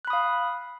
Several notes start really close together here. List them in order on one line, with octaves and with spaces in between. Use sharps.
F#6 B5 D#6 F5